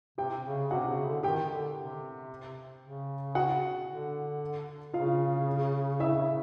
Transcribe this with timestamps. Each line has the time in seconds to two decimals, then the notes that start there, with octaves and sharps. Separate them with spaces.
0.18 C3 G4 G5
0.45 C#3
0.71 C3 F#4 F#5
0.89 C#3
1.06 D3
1.23 D#3 G4 G5
1.51 D3
1.77 C3
2.83 C#3
3.35 F#4 F#5
3.88 D3
4.94 C#3 F4 F5
6.00 E4 E5